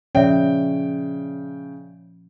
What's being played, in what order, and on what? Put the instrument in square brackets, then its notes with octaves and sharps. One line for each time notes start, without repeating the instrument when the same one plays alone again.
[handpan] A#2 F3 C#4 [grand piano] C#3 G5 [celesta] C#5 D5 E5